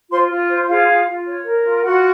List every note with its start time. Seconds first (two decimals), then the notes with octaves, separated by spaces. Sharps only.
0.10 F4 C5 C6
0.30 F4
0.49 C5
0.68 F4 G#4 F5
0.88 F4
1.06 F4
1.26 C#5
1.45 A#4
1.64 F4
1.83 F4 F#4 F#5